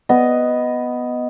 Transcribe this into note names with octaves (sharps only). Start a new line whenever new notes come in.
B3 D#5